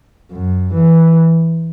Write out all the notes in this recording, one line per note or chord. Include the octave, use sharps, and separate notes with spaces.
F#2
E3